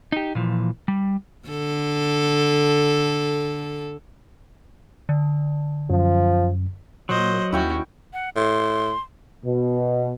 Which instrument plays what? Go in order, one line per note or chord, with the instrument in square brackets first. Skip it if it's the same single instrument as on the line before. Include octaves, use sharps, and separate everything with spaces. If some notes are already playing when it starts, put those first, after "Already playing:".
[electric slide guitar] D#4 G4
A#2 E3 F3
G3
[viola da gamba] D3 A4
[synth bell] D3
[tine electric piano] F#2 [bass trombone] F3
[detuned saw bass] A#2 [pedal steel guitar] F#3 [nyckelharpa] C5 D#5
[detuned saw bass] D#2 [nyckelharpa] C#4 F#4 [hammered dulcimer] E4 G5 C#6
[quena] F#5
[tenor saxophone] A2 [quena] C6
[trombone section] B2